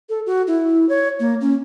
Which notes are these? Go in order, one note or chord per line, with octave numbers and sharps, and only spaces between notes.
A4
F#4
E4
C#5
A#3
C#4